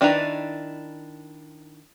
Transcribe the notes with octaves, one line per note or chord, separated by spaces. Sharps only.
D#3 D4 E4 B4 A#5